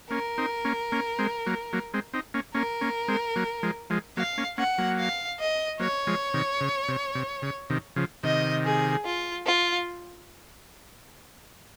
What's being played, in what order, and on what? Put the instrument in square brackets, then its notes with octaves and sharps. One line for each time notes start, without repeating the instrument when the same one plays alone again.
[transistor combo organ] A#3 C#4 [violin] A#4
[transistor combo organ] C4 D#4
A#3 C#4
A#3 C#4
G#3 C4
F#3 A#3
F#3 A#3
G#3 C4
C4 D#4
A#3 C#4
[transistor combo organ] A#3 C#4 [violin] A#4
[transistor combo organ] A#3 C#4
G#3 C4
F#3 A#3
F3 G#3
F3 G#3
[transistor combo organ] F#3 A#3 [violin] F5
[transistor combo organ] A#3 C#4
[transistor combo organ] A#3 C#4 [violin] F#5
[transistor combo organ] F#3 A#3
[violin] F5
D#5
[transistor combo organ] F#3 A#3 [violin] C#5
[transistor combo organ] F3 G#3
C3 D#3
C#3
C3
C3
C#3
C3 D#3
C#3 F3
[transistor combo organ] C3 D#3 [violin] D#5
[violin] G#4
F4
F4